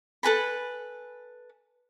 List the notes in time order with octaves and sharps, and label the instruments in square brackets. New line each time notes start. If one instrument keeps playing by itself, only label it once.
[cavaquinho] A4 B4 G#5 B5